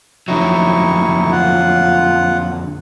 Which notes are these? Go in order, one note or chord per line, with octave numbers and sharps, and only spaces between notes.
F2 D3 F#3 D#4 E4 C#6
F4 F#5